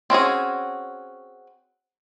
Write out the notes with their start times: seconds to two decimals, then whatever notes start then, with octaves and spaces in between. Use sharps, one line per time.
0.10 C4 C#4 F#4 G#4